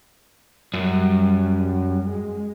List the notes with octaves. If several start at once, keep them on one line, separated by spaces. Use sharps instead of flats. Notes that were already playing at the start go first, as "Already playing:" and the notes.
F#2 G3
G#3